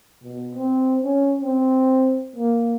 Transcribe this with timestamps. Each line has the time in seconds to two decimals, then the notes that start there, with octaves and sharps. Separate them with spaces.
0.23 B2
0.55 C4
1.04 C#4
1.41 C4
2.36 A#3